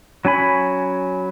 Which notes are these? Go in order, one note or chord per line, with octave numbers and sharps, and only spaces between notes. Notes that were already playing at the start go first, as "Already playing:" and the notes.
F#3 C#4 G#5 B5